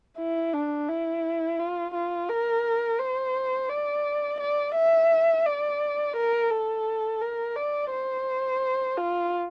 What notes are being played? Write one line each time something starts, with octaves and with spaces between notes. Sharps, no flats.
E4
D4
E4
F4
F4
A#4
C5
D5
D5
E5
D5
A#4
A4
A#4
D5
C5
F4